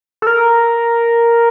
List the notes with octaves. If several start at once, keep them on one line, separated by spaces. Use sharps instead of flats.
A4
A#4